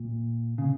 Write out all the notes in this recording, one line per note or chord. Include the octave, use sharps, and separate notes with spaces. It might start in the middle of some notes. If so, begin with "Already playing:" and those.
Already playing: A#2
C#3